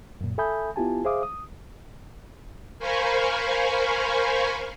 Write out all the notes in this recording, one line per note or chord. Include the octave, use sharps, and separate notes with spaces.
F#2 A#2
A4 E5 G#5 B5 D#6 G6
B3 E4 F4 G4 G#5 A5
G#4 C5 E5 F5 D6 D#6
D#6
A#4 C5 F5 G#5 B5 C#6